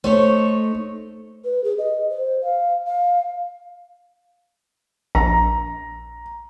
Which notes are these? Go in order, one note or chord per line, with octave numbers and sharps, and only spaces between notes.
A3 D#4 C5 C#5
B4
G#4
D#5
C5
F5
F5
A#1 A#5